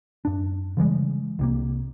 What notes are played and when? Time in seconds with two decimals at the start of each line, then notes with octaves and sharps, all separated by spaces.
0.25 F#2 D4
0.77 C#3 E3 G3 G#3
1.39 C2 C3 A#3